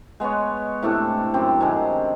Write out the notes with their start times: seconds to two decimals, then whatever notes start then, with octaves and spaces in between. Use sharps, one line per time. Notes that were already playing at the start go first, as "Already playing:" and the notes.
0.20 G#3 B3 B4 C#5
0.83 A2 C3 D4 A4
1.34 F#2 C4 G4
1.60 C3 D#3 D4 G#4